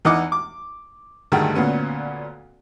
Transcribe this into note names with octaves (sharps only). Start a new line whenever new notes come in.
E2 E3 D#4 D#5 F#5 D6
D6
D2 G2 D3 D#3 A3 G#4
D2 A#2 B3 C#4